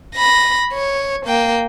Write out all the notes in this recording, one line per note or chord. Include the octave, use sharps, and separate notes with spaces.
B5 A#6
C#5
A#3 G5